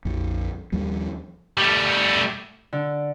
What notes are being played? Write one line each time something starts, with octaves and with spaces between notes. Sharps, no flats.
A#1 F2
D#2 F3 G3
G3 A3
D3